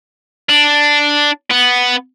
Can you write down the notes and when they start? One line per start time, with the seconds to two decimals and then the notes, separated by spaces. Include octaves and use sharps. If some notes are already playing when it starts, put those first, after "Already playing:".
0.49 D4
1.51 B3